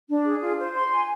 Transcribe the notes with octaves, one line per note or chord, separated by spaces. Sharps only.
D4
G#4
F4
C5
C6
G#5